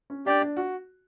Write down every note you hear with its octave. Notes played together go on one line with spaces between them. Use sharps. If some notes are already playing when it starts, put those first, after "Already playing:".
C#4
D4 G4 D5 G5
D4
F#4